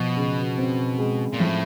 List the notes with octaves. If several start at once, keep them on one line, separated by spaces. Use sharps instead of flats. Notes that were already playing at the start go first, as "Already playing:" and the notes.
Already playing: B2 F3
C#3
C4
G#3
A#2
A2 F3